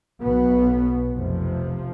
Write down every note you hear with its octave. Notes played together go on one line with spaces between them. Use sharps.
B1 B2 B3
F1 F2 C3 F3